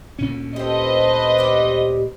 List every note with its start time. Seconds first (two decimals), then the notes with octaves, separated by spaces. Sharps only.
0.19 D2 A#2 C#4
0.56 G4 A4 B4 C5 D#5
1.38 G3 G4